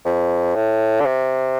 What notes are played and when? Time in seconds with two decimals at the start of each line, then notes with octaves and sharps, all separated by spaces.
0.05 F2
0.56 A2
1.00 D3
1.06 C3